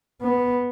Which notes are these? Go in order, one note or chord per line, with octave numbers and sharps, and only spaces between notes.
B3